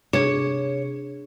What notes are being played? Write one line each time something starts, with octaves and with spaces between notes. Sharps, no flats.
C3 D4 G#4 C#5